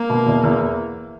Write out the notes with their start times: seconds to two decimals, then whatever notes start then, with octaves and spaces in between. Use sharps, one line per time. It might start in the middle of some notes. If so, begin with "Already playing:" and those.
Already playing: A#3
0.10 B2
0.27 E2
0.43 E2